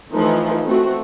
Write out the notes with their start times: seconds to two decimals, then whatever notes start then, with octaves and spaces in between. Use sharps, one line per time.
0.12 E3 F3 A3 D#4
0.65 A3 C4 F#4